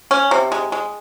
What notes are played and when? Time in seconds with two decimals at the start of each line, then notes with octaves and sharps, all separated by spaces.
0.11 C#4
0.31 C3
0.52 G#3
0.72 G#3